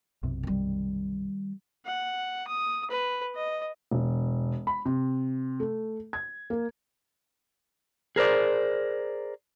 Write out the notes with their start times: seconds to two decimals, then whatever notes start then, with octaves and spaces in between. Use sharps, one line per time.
0.23 B1 F#2 C3
0.43 D#3 G3
1.86 F#5
2.47 D#6
2.90 B4
3.35 D#5
3.91 E1
4.67 B5
4.85 C3
5.60 A3
6.13 G#6
6.50 A#3
8.16 G#4 A#4 C5 D5